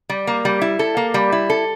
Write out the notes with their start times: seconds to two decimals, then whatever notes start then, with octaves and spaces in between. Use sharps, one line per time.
0.09 G3
0.27 A#3
0.45 G3
0.61 E4
0.79 A4
0.97 A#3
1.14 G3
1.32 E4
1.50 A4